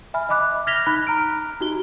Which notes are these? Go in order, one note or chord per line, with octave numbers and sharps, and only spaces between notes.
E5 G#5 B5 F6
D#5 E5 B5 D6 F#6
F6 G#6 A#6 B6 F7 G7
D#4 B5 F#6
A#5 F6 D7
D#4 F#4 G4 A#5 G7